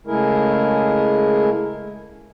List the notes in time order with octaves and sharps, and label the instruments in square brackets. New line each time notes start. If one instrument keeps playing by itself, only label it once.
[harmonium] C#3 G#3 A3 E4 G#4 A#4